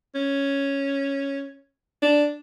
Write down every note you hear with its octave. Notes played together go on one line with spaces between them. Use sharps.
C#4
D4